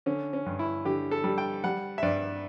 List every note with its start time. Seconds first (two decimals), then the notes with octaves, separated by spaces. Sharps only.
0.06 D3 C#4
0.33 C#4
0.46 G2
0.59 E4
0.85 D3 G4
1.11 A4
1.24 G3
1.38 G5
1.64 G3 F#5
1.98 E5
2.03 G2 D5